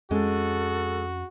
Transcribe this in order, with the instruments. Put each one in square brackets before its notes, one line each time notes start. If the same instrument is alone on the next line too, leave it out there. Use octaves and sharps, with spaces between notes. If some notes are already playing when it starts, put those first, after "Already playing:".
[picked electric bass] F2 C#4 [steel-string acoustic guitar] G#3 [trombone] F#4 [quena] A4